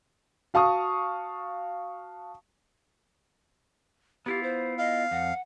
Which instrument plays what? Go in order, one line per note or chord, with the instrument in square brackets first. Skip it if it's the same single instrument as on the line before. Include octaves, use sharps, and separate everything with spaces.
[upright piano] F#4 F5 A5 C#6 D#6
[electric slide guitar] B3 E4 F4 [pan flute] G4
[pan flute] C5
[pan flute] D#5 [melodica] F5
[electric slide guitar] F2 [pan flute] F#5